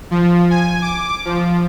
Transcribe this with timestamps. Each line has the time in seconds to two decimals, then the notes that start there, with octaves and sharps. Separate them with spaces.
0.11 F3
0.50 G#5
0.82 D6
1.25 F3